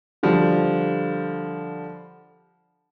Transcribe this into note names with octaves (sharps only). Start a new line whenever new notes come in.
D3 F3 G3